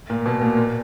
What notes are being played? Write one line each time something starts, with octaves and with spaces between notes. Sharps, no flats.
A#2
B2
A#2
A#2